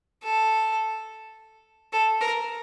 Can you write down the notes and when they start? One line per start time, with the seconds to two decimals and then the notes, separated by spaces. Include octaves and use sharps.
0.23 A4
1.93 A4
2.21 A#4